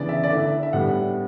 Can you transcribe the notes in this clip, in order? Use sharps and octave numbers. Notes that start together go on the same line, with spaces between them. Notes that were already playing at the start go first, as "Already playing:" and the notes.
Already playing: C#3 E3 B3 D4 D5
E5
D5
D3 A3 E4 E5
E5
A2 G3 B3 D4 F#5